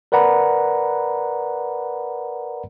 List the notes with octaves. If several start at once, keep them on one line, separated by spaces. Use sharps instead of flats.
A#4 B4 D5 F#5 A#5 B5